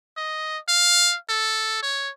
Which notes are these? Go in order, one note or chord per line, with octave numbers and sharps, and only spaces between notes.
D#5
F5
A4
C#5